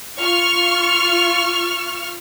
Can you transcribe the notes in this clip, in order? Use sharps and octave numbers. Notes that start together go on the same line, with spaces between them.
F4 C#6 F6